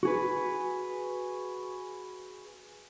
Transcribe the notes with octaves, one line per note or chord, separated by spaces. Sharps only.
F#4 G#4 B4